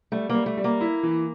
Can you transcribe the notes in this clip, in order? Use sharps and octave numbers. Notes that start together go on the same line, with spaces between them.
G3 A3
G3 A#3
A3
G3
A#3
E4
E3